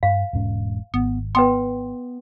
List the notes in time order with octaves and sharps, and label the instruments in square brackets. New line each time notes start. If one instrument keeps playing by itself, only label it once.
[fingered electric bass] G2 [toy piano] F5
[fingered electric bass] E1 G#2 C#4
[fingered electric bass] G#1 [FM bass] B3
[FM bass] B3 [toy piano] B4 G5 C6